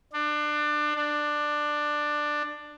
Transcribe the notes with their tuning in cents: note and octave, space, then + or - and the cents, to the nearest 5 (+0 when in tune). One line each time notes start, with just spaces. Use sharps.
D4 +25
D4 +15